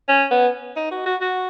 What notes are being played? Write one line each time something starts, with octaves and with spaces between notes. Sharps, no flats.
C#4
B3
D#4
F#4
F#4
F#4